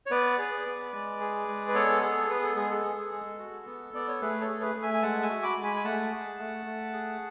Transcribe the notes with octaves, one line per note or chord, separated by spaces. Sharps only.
C#5
B3 B4 D5
G#4
B3
G#3
G#4
G#3
B4
B3 A4 C#5
G#4 A4
B3 B4
A4
G#3 G#4
A4
G#4
G#3
F#4
B3
B3 D5
C#5
A3 G#4 B4
A4 C#5
G#4
G#4 B4
A3
E5 G#5
G#5
G#3 F#5 A5
E5 G#5
F#4
B5 D6
G#3
G#5 B5
G#5
A3 F#5 A5
G#4
A3
A3
G#4